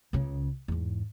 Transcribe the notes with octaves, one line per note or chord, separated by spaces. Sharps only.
C#2 C#3
E2 G#2